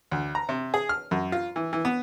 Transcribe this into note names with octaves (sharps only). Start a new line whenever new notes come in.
D2
A#5
C3
G#4
F6
F#2
F4
E3
E3
B3